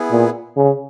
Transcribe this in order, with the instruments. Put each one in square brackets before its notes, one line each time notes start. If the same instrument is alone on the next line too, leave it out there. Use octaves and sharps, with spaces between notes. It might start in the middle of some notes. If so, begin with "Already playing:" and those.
Already playing: [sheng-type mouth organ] B3 E4 G#4
[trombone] A#2
C#3